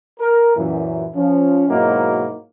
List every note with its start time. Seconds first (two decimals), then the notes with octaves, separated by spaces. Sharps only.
0.20 A#4
0.55 F#2 A#2 E3
1.15 F3 C#4
1.68 G#2 B2 F#3 A#3 D#4 E4